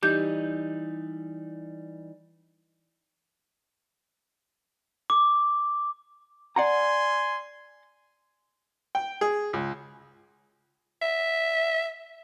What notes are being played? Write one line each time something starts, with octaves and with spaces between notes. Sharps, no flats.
E3 G3 D#4 G4 G6
D6
D5 F#5 G#5 A#5 C6
G5
G#4
C#2
E5